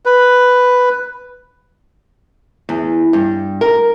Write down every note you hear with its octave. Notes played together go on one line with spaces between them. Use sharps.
B4
E2
G2
A#4